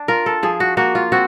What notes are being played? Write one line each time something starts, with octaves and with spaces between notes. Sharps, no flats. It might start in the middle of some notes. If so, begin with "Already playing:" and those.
Already playing: D4
F4 A#4
A4
F3 G#4
F#4
A#3 F#4
F4
C4 F#4